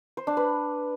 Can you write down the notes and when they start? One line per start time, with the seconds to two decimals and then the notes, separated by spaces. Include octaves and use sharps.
0.17 C5
0.27 D4
0.37 B4